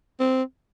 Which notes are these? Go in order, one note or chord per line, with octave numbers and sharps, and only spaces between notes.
C4